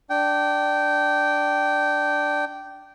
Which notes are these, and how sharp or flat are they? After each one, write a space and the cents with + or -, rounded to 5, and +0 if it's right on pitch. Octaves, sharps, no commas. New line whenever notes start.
D4 +0 G5 -15